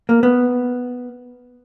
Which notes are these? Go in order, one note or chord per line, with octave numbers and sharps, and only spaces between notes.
A#3
B3